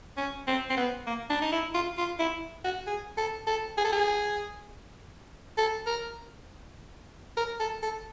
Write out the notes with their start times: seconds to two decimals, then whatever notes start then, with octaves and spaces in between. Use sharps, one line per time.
0.17 C#4
0.47 C4
0.70 C4
0.77 B3
1.07 A#3
1.30 D4
1.42 D#4
1.52 E4
1.75 F4
1.98 F4
2.19 E4
2.65 F#4
2.87 G#4
3.17 A4
3.47 A4
3.78 G#4
3.85 A4
3.93 G#4
5.58 A4
5.87 A#4
7.37 A#4
7.60 A4
7.83 A4